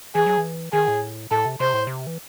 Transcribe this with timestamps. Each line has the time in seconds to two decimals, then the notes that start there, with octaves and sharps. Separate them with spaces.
0.15 E3 G#4
0.26 F#3
0.38 E3
0.73 D#3 G#4
0.88 A2
1.31 A2 A4
1.46 C3
1.60 C3 C5
1.74 A2
1.87 C3
2.07 E3